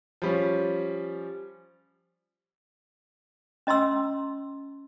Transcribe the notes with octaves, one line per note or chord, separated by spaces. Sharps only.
F3 G3 C#4
C#4 D#5 A#5 C6 E6